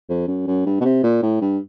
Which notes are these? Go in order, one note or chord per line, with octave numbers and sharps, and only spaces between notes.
F2
F#2
F#2
G2
B2
C3
A#2
A2
G2